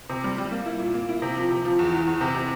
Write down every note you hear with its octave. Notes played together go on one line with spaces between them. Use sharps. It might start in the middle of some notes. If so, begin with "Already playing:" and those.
C3
G3
G3
A#3
E4
A#2
A#3
E4
C3
F3
C3
F3
E2
E3
E2
C3
C3